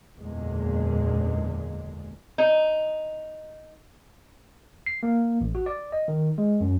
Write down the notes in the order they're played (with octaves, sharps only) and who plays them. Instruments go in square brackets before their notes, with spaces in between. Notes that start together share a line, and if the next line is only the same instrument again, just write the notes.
[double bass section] F#1 E2 A#2 D3 G#3
[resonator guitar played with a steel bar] D#4
[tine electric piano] C7
A#3
A1
F#4
D5
D#5
D#3
G#3
F#2